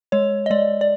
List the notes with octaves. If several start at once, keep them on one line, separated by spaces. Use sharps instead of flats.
G#3 C#5
D#5
G#3 D5
D5